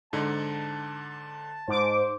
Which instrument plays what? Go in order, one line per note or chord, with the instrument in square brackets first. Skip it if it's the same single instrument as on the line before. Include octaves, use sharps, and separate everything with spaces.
[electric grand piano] G#2 D3 D#4 [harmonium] A5
[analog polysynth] G#2 D6 [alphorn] C5